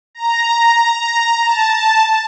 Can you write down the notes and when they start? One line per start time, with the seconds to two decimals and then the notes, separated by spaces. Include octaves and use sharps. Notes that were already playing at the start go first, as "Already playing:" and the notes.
0.15 A#5
1.45 A5